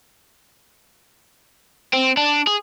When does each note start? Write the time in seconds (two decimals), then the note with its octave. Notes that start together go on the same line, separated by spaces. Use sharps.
1.94 C4
2.17 D4
2.47 G#4